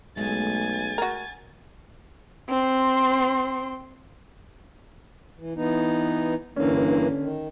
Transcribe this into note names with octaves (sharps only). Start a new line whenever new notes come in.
B1 G#3 A3 G#5 A6
F#4 A#4
C4 C6
E3
E3 B3 D#4
G2 D3 E3 A#3 C#4
D#3